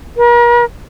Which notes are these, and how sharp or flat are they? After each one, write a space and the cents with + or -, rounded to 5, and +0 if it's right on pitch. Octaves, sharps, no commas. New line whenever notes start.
A#4 +45